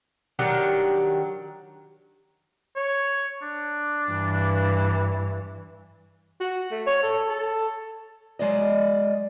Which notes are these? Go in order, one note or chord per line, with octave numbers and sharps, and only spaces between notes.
D#3 F#3 D4 G4
C#5
D4
G2 E3
F#4
A3
C#5
A4
A4
F#3 G#3 D5 D#5